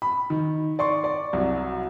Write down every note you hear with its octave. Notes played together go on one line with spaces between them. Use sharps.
B5
D#3
D5 C6 C#6
D5
C2 F#3